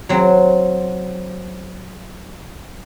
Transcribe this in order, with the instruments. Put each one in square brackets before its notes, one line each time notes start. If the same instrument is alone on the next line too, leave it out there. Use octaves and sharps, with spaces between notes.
[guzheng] F#3 C4